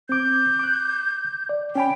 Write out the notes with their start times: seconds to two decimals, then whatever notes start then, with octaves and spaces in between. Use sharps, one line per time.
0.09 C4 D6 G6
0.59 D6 F#6
1.49 D5
1.75 C#4 G5 G#5 B5